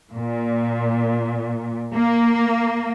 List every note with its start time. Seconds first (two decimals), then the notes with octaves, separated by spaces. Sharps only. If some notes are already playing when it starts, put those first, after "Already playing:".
0.14 A#2
1.93 A#3